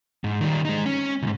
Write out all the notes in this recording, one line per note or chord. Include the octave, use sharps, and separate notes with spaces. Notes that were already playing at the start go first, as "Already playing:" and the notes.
G#2
D#3 G3
G#3 D#4
C#4
C#2 G#2